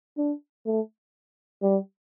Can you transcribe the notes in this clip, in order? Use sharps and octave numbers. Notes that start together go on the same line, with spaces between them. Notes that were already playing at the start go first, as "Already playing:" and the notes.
D4
A3
G3